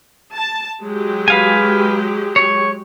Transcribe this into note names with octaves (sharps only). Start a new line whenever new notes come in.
A5
F#3 G#3 G4
B4 F5 G#5
C#5